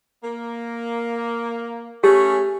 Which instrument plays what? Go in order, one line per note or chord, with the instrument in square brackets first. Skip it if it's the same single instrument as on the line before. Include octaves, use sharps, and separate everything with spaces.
[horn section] A#3
[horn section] A3 C#4 G#4 [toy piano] G4